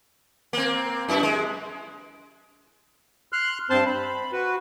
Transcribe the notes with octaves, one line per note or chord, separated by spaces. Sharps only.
A#3 C4
F#2 E4
G#3
C6 F6 F#6
G2 C4 C5 A5 C6
B5
F#4 B4